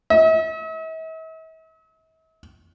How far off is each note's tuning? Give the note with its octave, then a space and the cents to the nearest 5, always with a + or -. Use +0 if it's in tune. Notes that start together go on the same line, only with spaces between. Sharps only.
E5 -45